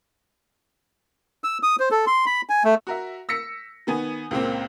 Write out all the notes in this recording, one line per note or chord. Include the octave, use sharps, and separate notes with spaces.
E6
D#6
C5
A4
C6
B5
G#5
A3
F#4 A#4 E5
E6 A#6 B6 C#7
D#3 B3 G#5
C#2 A#2 A#3 C4